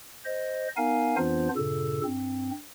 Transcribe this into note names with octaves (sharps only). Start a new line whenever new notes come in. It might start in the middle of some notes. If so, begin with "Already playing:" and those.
C5 D#5
B3 D#4 A#4 F5 G#5
F2 E3 B3 D4 F4 C5
G2 A#2 C#3 A4
G2 C4